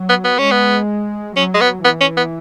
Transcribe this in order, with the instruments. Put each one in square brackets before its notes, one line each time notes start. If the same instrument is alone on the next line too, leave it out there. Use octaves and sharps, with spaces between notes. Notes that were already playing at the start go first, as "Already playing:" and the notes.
Already playing: [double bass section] F#3
[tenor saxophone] B3
B3
[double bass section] G#3 [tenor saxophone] C#4
[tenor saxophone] B3
[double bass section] F#3 [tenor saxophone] C#4
[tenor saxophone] G#3
B3
[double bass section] E3 [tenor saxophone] B3
[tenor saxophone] C#4
B3